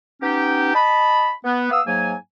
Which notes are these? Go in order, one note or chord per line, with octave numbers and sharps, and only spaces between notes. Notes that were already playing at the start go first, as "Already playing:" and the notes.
B3 C#4 D#4 G4
D#5 A5 B5
B3
B3 F5 D#6 E6
G#2 F#3 A#3 G#5